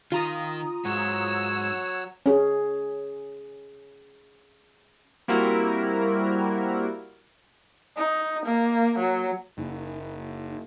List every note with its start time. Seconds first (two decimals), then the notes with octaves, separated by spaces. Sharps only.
0.12 D#3 F4 A#5 D#6
0.85 G#2 F#3 C#5 F#5 E6
2.26 C#4 G#4
5.28 G3 A#3 C4 E4 F#4 A#4
7.97 D#4
8.46 A#3
8.99 F#3
9.58 F#1 D#4